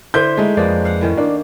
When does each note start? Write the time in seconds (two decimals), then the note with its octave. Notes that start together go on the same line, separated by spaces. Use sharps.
0.14 D3 E4 C5 G6
0.37 G#3 A3 D#4
0.57 F2 F3 A#3 B4 D5
0.85 F5 F#5
1.01 A2 D#3 C#4
1.17 A#3 D4